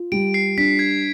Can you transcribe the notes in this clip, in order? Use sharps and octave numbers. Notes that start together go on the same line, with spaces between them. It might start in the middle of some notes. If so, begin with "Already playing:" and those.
Already playing: F4
G3 D7
C7
D4 B6
G#6